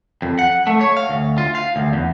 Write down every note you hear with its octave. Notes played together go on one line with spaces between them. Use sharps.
F2
F#5
A3
C#5
F5
D2
F4
F5
D2
E2